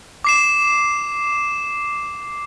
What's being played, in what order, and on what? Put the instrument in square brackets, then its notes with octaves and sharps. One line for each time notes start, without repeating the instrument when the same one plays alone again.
[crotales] D6 C7 E7